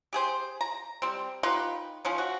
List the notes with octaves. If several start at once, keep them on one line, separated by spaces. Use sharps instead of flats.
G4 G#4 C5
A#5
G3 C4
D#4 F4 G4 B4
F3 C#4 D#4
F#4